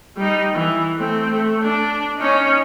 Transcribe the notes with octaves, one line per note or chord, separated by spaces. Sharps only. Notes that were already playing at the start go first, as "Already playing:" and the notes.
G3 D#4
E3
A3 C4
A3
D4
C#4 D#4